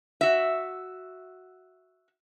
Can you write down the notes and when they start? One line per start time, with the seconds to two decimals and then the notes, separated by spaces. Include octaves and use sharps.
0.21 F#4 E5